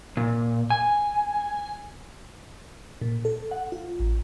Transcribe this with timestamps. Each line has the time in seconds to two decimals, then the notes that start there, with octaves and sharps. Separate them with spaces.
0.17 A#2
0.70 G#5
3.02 A#2
3.25 A4
3.51 F#5
3.72 F4
4.00 A1